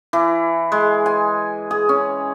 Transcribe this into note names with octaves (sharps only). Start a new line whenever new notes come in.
E3
G#3
G#5
G#4
C#4